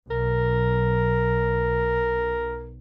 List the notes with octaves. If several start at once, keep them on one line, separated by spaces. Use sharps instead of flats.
B1 A#4